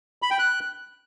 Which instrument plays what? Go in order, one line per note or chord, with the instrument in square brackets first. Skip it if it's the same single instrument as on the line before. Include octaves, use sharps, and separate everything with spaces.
[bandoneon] B5
G5
F#6